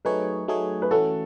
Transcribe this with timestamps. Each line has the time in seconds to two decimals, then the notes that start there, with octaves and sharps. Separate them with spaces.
0.05 F#3 A3 D#4 G#4 B4 C#5
0.48 F#3 A3 D#4 G#4 C#5
0.82 B4
0.91 E3 A3 C#4 F#4 A4